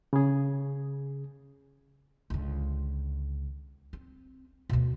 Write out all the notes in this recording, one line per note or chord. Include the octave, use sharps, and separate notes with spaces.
C#3 G#4
C#2 D3
C4
D2 B2